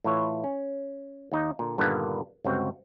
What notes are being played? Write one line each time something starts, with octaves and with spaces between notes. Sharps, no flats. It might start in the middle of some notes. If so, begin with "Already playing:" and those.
A2 E3 E4 F4 C#5
C#4
D#2 D#4
A#2 D3
G2 A#2 D3 D#3 A#3 B3
G1 C#2 C4 F#4